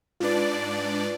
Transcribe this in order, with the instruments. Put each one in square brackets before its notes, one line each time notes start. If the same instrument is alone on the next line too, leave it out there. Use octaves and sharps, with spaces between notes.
[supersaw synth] G#2 D4 D5 [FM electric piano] F4 B4